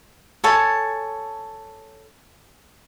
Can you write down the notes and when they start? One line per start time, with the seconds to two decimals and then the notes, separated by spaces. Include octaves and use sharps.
0.44 A4 C#5 G#5 A5